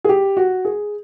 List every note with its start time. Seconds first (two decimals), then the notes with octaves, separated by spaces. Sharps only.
0.04 G#4
0.09 G4
0.37 F#4
0.65 G#4